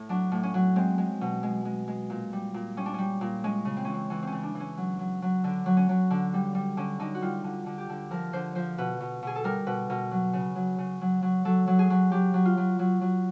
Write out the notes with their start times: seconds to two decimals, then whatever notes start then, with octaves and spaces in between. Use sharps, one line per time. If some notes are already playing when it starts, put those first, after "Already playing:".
Already playing: A2
0.09 F#3 D4
0.32 A2
0.43 C#4
0.54 F#3
0.76 G#3 C4
0.98 G#3
1.21 B2
1.43 G#3
1.65 G#3
1.88 G#3
2.10 A#2
2.33 G3
2.54 A#2
2.77 G3 C#4
2.86 D4
2.94 G3 C#4
3.21 A#2
3.44 G#3 C#4
3.65 C#3
3.77 C4
3.85 E3 C#4
3.94 C4
4.10 E3 C#4
4.22 C4 C#4
4.32 C#3
4.43 D4
4.55 E3
4.60 C#4
4.77 F#3
4.99 F#3
5.22 F#3
5.44 D3 D4
5.66 F#3
5.77 C#4
5.89 F#3
6.10 D3
6.34 G3
6.55 G3
6.77 D3 C#4
7.00 D3 D#4
7.15 F#4
7.22 G3 F4
7.44 D3
7.66 D3
7.78 G4
7.90 D3
8.11 F3 A#4
8.33 D3 C5
8.55 F3 C5
8.78 B2 B4
9.00 B2
9.23 B2 G#4
9.36 A4
9.44 G3 A#4
9.66 B2 B4
9.90 B2 A#4
10.11 F#3
10.33 C#3
10.56 F#3
10.78 C#3
11.01 F#3
11.22 F#3
11.45 F#3 A4
11.67 F#3
11.79 G#4
11.90 F#3
12.12 F#3 G4
12.34 F#3
12.45 F4
12.57 F#3
12.79 F#3
13.01 F#3